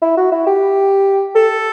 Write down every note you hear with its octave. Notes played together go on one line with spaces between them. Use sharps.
E4
F#4
E4
G4
A4